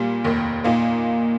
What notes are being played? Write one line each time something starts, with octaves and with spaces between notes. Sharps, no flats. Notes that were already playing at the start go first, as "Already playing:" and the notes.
Already playing: A#2 G3
F1 D#2 D#3
A#2 A#3 D#4